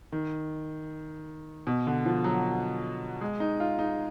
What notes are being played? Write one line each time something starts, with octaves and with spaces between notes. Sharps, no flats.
D#3
B2
D3
F3
F#3
G#3
D#4
F4
D#4